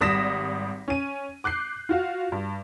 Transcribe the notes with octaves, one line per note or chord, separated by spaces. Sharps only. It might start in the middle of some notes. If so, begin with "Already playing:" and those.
G#1 G3 D#6 A#6 B6 E7
C#4 D#7
D6 F#6 G6 C7
F4 F#4 F5
G2